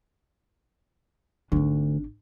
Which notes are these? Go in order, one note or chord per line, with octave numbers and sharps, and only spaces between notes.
G#1 D2 D4